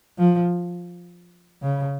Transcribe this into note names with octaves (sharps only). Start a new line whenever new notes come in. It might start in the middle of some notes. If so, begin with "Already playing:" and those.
F3
C#3